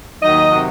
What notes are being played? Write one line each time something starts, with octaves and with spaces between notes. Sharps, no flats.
D#2 D#3 F#3 D#4 D#5
C3 D#3 F#3